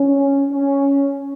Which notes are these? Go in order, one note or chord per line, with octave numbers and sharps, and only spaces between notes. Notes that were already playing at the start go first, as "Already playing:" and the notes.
Already playing: C#4
C#4